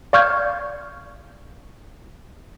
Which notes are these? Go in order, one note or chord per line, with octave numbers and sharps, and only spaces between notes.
D5 F5 C#6 F6 G6 G#6